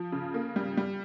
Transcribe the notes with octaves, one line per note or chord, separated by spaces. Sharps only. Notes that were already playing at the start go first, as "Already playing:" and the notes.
Already playing: F3
C#3
A#3
G3
G3